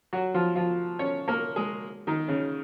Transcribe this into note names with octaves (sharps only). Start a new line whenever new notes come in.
F#3 F#4
F3 F4
F3 F4
C#4 C#5
A#3 A#4
G#3 G#4
D#3 D#4
C#3 C#4